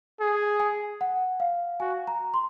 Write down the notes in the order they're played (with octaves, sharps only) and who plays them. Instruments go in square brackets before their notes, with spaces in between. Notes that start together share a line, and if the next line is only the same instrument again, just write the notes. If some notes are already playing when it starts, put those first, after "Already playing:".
[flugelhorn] G#4
[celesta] G#5
F#5
F5
[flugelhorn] F#4 [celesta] G#5
[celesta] A#5
C6